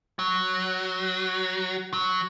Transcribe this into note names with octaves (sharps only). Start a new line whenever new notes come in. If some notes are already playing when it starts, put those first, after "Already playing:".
F#3
F#3